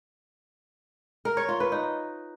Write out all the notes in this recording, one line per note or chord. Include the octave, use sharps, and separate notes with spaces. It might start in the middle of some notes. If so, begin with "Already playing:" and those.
A#4
C#5
F4
B4
D#4